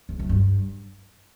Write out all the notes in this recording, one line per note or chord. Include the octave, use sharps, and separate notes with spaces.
E2
F#2
G2